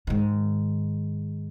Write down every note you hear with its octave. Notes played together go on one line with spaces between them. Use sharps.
G#2 D#3